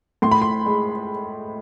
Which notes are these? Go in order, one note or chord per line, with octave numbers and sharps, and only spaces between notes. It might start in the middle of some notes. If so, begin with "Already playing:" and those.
A2 C6
B5
C6
G#3